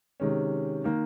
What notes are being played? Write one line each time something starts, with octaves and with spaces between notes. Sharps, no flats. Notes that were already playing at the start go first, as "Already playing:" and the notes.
C3 D#3 G#3 C#4
D#3 A#3